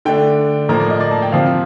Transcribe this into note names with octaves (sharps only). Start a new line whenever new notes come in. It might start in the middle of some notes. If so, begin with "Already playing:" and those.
D3 A3 D4 G5
A2 F3 A#3 A#5
D5
D#5
D5
A5
G5
C3 F3 C4 F5